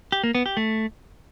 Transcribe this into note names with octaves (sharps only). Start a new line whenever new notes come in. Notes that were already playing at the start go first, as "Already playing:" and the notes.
G4
A#3
B3
G4
A3